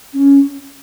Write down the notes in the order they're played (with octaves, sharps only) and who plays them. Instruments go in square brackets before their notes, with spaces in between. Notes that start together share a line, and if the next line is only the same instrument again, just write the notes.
[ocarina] C#4